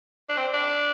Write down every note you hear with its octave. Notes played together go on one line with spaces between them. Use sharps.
D4
C4
D4